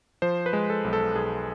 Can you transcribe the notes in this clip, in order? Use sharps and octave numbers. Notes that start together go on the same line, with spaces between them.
F3 C5
B4
G#3
A4
B1
A4
B1 G#4